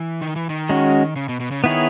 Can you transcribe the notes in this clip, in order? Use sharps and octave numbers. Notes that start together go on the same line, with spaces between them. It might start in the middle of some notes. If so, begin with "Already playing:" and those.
Already playing: E3
D#3
E3
D#3
G#3 C#4 F#4
C#3
B2
B2
C#3
D#3 B3 E4 G#4 C#5